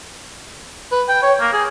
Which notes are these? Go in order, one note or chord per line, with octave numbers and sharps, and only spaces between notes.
B4
G5
C#5
A#3
G#4